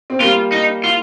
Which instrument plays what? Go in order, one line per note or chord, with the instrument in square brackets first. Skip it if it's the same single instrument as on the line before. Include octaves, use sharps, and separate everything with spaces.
[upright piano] C4
[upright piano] G3 A#3 [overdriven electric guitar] F4
[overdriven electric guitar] D#4
F4